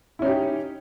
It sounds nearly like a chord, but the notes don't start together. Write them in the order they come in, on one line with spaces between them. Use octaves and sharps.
E4 C#4 D#4 G4